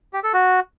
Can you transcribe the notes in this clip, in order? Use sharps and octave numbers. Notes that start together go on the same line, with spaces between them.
G4
A4
F#4